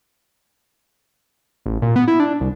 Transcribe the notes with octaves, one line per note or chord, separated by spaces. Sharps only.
A1
A#2
B3
E4
D4
C2